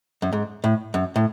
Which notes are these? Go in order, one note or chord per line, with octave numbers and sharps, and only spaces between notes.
F#2
G#2
A2
F#2
A2